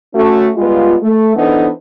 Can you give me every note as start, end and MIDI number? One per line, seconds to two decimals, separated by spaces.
0.14 0.50 57
0.14 0.50 61
0.14 0.50 66
0.56 0.95 55
0.56 0.95 56
0.56 0.95 59
0.56 0.95 65
1.02 1.35 57
1.36 1.69 52
1.36 1.69 59
1.36 1.69 62
1.36 1.69 63
1.36 1.69 69
1.36 1.69 72